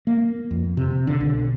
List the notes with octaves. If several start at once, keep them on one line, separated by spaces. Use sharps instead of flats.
A#3
F2
C3
D3
B1